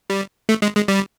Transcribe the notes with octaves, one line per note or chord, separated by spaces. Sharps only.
G3
A3
G#3
G#3
G3